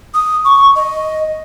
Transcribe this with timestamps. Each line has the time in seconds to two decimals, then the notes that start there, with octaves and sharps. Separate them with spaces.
0.14 D#6
0.45 C#6
0.76 D#5